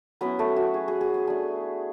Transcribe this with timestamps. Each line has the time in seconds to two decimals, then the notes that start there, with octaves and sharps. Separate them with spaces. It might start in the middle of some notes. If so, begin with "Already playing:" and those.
0.21 F#3 B3 C#4 E4 B4
0.39 A3 A4
0.56 F#4
0.74 G#4
0.88 G#4
1.01 G#4
1.14 G#4
1.27 A3 D4 G#4